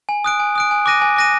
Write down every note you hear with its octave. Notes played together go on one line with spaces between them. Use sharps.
G#5
D#6 F#6 D7
G#5
D#6 F#6 D7
G#5
D6 F#6 A#6 D#7
G#5
D6 F#6 A#6 D#7